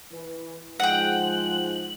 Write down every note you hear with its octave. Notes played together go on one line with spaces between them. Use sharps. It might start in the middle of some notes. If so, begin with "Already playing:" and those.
E3 B4
G#2 F3 G#3 F#5 G5 F#7